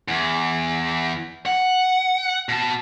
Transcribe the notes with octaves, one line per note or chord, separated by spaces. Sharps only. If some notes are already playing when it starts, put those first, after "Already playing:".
E2
F#5
B2 A5